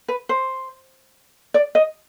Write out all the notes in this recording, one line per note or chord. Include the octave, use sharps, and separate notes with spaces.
B4
C5
D5
D#5